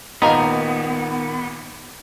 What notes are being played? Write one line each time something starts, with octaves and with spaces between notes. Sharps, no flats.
G#1 D#2 A#2 D#3 B3 D#4 A#4 F5